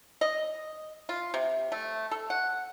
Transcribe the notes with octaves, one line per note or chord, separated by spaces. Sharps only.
D#5
F4
C3
A3
A4
F#5